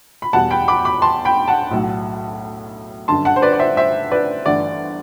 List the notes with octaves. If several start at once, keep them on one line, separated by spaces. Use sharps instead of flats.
B5
E2 B2 G3 F#5 A5
G5 B5
B5 D6
B5 D6
A5 C6
G5 B5
F#5 A5
B1 A2 F#3 A3
G1 F#2 D3 A5 C6
F#5 A5
C5
B4 D5
D5
C5 E5
C5 E5
B4 D5
G1 G2 E3 A3 D5 F#5